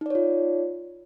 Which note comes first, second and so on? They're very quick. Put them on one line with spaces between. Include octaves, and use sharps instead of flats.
D#4 D5 C#5 F4